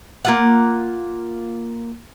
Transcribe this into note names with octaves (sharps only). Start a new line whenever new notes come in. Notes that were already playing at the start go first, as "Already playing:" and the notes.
A#3 F4 F#5